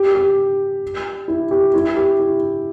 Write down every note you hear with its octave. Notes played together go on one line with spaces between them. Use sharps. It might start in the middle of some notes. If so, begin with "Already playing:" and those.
Already playing: G4
G4
E4
G4
E4
G4
E4